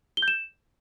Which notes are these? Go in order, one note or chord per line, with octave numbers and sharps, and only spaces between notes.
G7
G6
E7